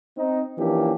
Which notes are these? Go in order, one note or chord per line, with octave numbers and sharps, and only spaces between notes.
C4 D#4
E3 F3 A#3 C#4 D4 G4